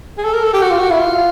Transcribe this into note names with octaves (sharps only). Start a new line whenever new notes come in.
G#4
A4
A#4
A4
G4
F#4
F4
F#4
E4
F4